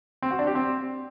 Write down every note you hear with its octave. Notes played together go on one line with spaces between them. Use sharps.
C4
F#4
D4
G4
C4